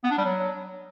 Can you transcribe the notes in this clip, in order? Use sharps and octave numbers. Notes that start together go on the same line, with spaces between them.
B3
D4
G3
F#3